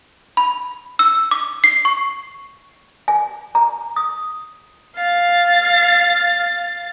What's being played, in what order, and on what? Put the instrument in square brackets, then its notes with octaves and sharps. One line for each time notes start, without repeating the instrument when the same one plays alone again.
[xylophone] B5
E6
D6
C7
C#6
[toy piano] G#5
A#5
D#6
[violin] F5 A6